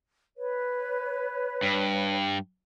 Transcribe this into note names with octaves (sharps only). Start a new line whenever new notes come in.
B4 C#5
G2